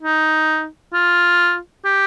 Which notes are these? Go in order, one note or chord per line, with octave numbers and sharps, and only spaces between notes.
D#4
F4
G4